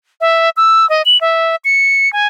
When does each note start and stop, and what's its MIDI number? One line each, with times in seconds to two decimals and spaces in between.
0.21 0.50 76
0.57 0.88 88
0.89 1.02 75
1.05 1.20 102
1.21 1.56 76
1.65 2.11 97
2.13 2.27 80